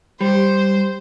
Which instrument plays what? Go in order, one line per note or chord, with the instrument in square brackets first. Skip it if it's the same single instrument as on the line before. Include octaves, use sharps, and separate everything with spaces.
[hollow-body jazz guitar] G3 [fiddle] C5